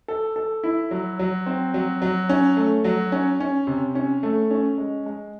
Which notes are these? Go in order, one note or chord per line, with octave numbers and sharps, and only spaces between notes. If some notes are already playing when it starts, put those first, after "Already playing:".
A4
A4
E4
F#3
F#3
C4
F#3
F#3
C#4
A3
F#3
C#4
C#4
C3
C#4
A3
C#4
G#3
G#3